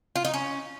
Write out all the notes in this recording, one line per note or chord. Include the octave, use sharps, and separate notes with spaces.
F4
D#4
C#4